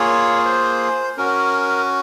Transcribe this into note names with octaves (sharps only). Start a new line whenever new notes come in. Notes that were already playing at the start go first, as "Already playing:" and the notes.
Already playing: A#3 F4 G#4 C#5
C5
C#4 F#4 A#4